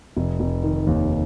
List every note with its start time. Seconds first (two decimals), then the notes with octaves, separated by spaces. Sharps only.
0.17 F1
0.40 F1
0.63 D#3
0.87 D#2